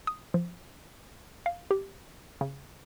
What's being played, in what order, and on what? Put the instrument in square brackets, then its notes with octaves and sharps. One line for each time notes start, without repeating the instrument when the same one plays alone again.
[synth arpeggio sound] D#6
F3
F5
G4
C#3